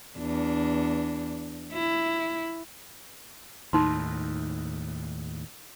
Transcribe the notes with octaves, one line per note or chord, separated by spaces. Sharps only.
E2 D4
E4
D#2 A2 D#4 B5 C6